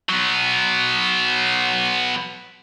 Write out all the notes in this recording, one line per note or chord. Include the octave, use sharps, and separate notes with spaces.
F#3 B3